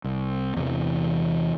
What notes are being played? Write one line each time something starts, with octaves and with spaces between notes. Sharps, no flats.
C2
E2 C3 E3